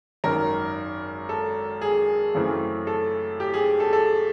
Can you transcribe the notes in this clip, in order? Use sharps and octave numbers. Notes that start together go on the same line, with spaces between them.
G#1 F#2 D#3 A#4
A4
G#4
F#2 C#3 E3 A3 C4
A4
G4
G#4
A4
A4